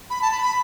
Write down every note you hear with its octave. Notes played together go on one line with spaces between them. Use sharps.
B5
A5
B5
B5